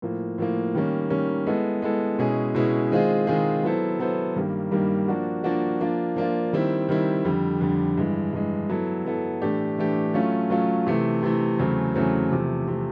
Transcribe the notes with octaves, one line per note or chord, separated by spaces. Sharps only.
A2 F3 A#3
A2 F3 A#3
D#3 G3 A#3 C#4
D#3 G3 A#3 C#4
G#3 B3 E4 A4
G#3 B3 E4 A4
B2 G#3 C#4 E4 G#4
B2 G#3 C#4 E4 G#4
D#3 G#3 C4 F4 G#4
D#3 G#3 C4 F4 G#4
F#3 B3 E4 A4 C5
F#3 B3 E4 A4 C5
G2 D#3 G3 A#3
G2 D#3 G3 A#3
F3 A#3 D4 F#4
F3 A#3 D4 F#4
F3 A#3 D4 F4
F3 A#3 D4 F4
D#3 G3 C4 E4
D#3 G3 C4 E4
F2 D3 G3
F2 D3 G3
G2 E3 G#3
G2 E3 G#3
F#3 B3 E4 A4
F#3 B3 E4 A4
A2 E3 A3 D4 G4
A2 E3 A3 D4 G4
F#3 A3 C#4 F4
F#3 A3 C#4 F4
C3 E3 A3
C3 E3 A3
E2 C#3 F#3 A3 C4
E2 C#3 F#3 A3 C4
E2 C3 F3 A3
C3 F3 A3